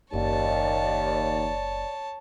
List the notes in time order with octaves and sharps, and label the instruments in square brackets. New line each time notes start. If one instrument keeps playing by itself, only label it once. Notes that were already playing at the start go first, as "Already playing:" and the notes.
[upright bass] F#1 [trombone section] D#2 [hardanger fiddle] C#5 A5 [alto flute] D5